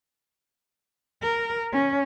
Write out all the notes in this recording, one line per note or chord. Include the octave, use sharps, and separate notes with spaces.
A#4
C#4